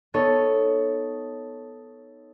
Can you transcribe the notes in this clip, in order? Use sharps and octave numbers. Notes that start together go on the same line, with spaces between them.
B3 D#4 A4 C#5